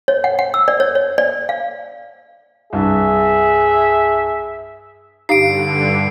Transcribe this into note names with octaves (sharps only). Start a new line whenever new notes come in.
C#5
F#5
F#5
E6
D5
C#5
C#5
D5
F5
C2 G2 G#4 E5
G2 D3 D#4 G4 F5 C7 D7